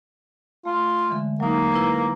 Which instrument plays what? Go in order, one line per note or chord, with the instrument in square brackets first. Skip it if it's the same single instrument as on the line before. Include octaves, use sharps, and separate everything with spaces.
[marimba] A3 [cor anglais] F4
[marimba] D3 E3 G#3
[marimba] F#3 D#4 [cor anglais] A#3
[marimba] E4 B4 G#6